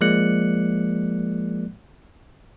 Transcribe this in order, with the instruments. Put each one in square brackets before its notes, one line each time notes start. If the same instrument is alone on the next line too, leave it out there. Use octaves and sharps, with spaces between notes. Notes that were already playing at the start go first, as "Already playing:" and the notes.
[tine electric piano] F3 G#3 A#3 D5 F#6 C#7